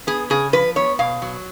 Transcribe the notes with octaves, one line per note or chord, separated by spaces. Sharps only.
B3 G#4
C#3 G#4
F3 B4
B3 C#5
B2 F5
F#3